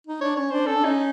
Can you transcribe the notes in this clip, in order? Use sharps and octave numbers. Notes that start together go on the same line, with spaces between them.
D#4
D4 C#5
C#4 C#5
D4 C5
C#4 A4
D4
C#4 D#4